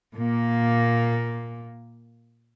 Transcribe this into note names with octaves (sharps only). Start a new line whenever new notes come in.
A#2 A#3